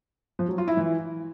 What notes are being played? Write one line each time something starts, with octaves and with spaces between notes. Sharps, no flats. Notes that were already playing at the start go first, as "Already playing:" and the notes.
F3
F#3
F4
E4
E3